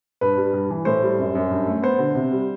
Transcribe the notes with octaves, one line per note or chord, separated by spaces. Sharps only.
G2 B4
G3
G2
E3
A2 C5
G3
F#2
F#2
G2
A3
B3 C5
D3
C3
G3